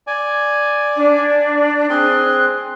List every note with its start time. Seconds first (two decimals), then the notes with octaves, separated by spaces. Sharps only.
0.07 D5 G#5
0.96 D4
1.90 C4 G#4 C6 F#6